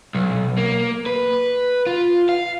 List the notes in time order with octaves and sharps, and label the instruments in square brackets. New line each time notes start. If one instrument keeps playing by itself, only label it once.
[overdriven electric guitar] B1
A#3
B4
F4
F5